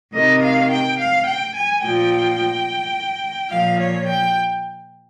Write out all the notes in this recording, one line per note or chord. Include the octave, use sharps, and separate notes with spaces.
C3 D#3 D#5
F5
G5
F5
G5
G#5
A#2 F3 G5
A#2 F3 F5
C#5
G5